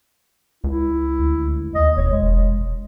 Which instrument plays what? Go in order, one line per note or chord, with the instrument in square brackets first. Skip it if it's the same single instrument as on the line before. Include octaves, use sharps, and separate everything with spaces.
[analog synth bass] C#2 [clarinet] E4
[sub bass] D2
[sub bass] D#2 [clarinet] D#5
[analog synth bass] E1 [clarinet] C#5
[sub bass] F1 [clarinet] G#3